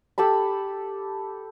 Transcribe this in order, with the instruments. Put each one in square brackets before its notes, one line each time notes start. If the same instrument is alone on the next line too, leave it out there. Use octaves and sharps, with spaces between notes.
[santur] G4 A4 A5 B5